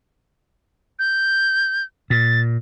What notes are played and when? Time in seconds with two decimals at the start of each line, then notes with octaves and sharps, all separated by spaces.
0.99 G6
2.10 A#2 A6